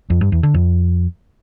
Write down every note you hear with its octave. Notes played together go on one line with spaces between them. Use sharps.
F2
G2
E2
D3
F2